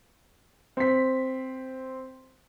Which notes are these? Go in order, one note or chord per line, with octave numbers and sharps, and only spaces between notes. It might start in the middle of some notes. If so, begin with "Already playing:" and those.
C4 B6